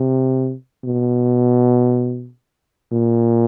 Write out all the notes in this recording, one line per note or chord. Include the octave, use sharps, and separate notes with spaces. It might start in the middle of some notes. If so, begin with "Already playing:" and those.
Already playing: C3
B2
A#2